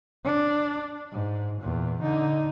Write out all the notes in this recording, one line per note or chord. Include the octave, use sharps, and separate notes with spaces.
D4
G#2
E2 A#2
D3 D#4